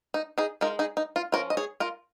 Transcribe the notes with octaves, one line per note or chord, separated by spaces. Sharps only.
D#4
D#4 G#4
G#3 D#4 F4 A#4
D#4 G#4
D#4
F4
F3 C#4 F4 A#4
D#5
G#4 C#5
F4 A#4